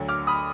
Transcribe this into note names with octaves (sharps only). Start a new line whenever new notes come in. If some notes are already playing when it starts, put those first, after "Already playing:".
Already playing: D2 D3 F#3
D6 F6
B5 D#6